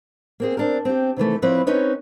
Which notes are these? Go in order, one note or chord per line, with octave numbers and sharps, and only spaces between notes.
A#3 C4 G#4
C4 D4 A#4
C4 G4
C3 D#3 E3 A3
F3 C4 E4 B4 C#5 D5
C4 C#4 D#4 B4 C#5